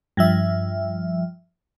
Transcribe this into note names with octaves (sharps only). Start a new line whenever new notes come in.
G2 F3 E5